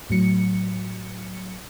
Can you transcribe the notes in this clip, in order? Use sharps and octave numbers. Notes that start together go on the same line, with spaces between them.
A2 F#3 C#7